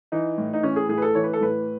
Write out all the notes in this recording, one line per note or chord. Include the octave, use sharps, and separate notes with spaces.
E3 D#4
A2
D#4
E3 C#4
G#4
A2 G#4
B4
A4
E3 C#5
B4
A4
A2 B4